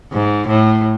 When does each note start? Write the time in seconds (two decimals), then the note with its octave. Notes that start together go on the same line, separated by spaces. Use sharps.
0.12 G#2
0.48 A2